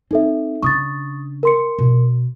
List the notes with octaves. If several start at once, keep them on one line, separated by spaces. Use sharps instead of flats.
C4 D#4 A4 E5
C#3 D4 C#6 D#6 A6
A#4 C6 C#7
B2